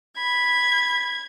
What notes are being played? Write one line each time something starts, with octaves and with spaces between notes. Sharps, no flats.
B5 G#6